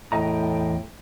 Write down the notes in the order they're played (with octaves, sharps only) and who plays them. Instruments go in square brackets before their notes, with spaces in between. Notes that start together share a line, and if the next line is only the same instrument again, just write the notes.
[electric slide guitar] E2 D#5 A#5 [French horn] A2 [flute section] G5